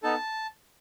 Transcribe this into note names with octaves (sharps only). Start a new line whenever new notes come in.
B3 D#4 A4 A5